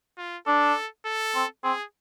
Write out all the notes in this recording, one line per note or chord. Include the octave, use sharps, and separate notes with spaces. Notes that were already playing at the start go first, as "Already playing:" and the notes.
F4
D4 A4
A4
C4
C4 G#4